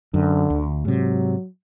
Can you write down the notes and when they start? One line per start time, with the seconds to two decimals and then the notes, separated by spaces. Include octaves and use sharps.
0.14 F#2 D3
0.50 D2
0.85 G#2 C3 F#3